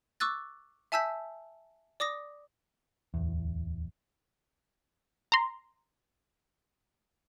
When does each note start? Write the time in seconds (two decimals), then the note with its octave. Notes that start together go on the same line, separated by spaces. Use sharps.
0.20 C#6 D6 E6 F#6 A6
0.92 E5 G#5 A5 E6 G6 B6
2.00 D5 D6 D#6 A#6
3.14 D1 E2
5.32 A#5 C6